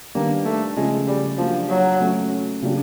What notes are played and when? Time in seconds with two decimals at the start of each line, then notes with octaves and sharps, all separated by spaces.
0.15 D#3 G3 A#3 B3 D4
0.45 A3
0.76 C#3 F3 G#3 A3 C#4
1.08 G3
1.38 F3 F#3 A#3 D4 G4
1.69 F#3
2.00 F#3 A3 C#4
2.62 C#3 F#3 A#3 D4 G4